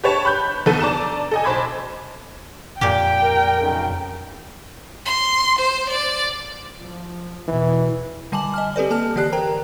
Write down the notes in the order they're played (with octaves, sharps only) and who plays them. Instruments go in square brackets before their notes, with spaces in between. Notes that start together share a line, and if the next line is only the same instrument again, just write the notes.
[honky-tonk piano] G4 B4 C#5 A5
B5 F#6 G6
D#2 B3 A4 D#7
D4 D5 A5 A#5 E7
A4 D#5 G#5
B1 C5 A5 B5 D6 G#6
[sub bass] F2 [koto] A#2 G4 [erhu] G5
[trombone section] A#4
B1 C#3
[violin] C6
C5
D5
[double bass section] F3
[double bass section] E2 B2 [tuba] E3
[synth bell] D3 G3 G#5 A5 D6 F#7
D#5 G#5 F6
C4 G4 A4 B4 D5
A#3 A4 A5 F6
D3 E3 G4 D5 F#6 C7
A#4 C5 G5 A#5